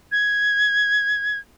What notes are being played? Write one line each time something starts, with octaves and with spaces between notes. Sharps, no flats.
G#6